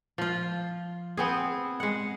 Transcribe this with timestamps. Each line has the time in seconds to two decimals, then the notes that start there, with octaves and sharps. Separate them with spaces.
0.18 F3 F4
1.17 B3 C4 G#4
1.80 G#3 F#5